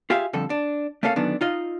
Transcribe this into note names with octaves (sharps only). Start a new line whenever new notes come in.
F4 G4 G#4 E5 F5
F2 D3 G3 A4
D4
A3 A#3 C#4 A4 F5
F#2 D3 D#3 B3 D4
D#4 F4 D#5